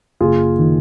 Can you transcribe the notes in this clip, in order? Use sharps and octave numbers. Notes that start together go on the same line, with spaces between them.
F#1 F4 G#4
D#3